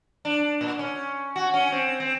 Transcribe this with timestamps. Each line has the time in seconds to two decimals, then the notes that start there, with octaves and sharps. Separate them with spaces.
0.25 D4
0.61 A#2
0.79 C#4
1.36 F#4
1.54 C#4
1.72 C4
2.00 C4